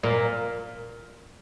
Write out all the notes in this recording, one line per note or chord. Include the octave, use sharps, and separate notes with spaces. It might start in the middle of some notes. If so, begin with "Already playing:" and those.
A#2